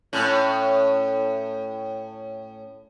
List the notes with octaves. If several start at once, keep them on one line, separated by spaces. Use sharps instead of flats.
A2 C#4